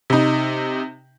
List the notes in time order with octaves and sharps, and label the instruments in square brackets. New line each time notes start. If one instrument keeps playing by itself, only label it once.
[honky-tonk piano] C3 D#4